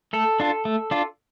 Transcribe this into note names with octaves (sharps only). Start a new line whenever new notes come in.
A3 A4
D4 F4
A3
D4 F4